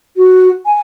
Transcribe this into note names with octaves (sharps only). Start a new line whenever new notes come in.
F#4
G#5